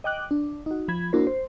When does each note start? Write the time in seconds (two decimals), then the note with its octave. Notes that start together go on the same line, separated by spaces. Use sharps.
0.04 D#5 G5 D6 F#6
0.31 D4
0.66 D#4 F#4
0.88 F3 B5 G#6
1.13 A#3 D4 E4 F#4 A#4 C5
1.27 C5